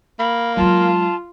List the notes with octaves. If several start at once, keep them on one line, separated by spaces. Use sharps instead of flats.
A#3 B5
F#3 G#3 F4 A5